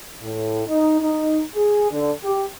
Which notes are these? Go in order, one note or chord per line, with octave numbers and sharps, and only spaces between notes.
A2
D#4
D#4
G#4
D3
G4